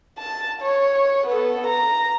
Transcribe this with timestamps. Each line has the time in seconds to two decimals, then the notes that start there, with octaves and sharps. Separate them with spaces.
0.19 A5
0.62 C#5
1.27 B3 A4
1.67 A#5